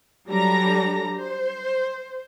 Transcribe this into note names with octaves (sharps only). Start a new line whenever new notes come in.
F#3 G3 D4 A4 A#5 A#6
C5